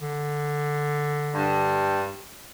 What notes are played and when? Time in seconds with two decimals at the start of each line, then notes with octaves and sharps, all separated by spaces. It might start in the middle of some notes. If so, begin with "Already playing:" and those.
0.01 D3
1.34 G2